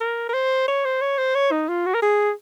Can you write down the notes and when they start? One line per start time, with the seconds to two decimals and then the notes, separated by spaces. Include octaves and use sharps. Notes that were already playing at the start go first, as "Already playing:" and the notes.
0.01 A#4
0.29 A#4
0.34 C5
0.68 C#5
0.85 C5
1.01 C#5
1.18 C5
1.35 C#5
1.52 D#4
1.69 F4
1.86 F#4
1.95 A#4
2.02 G#4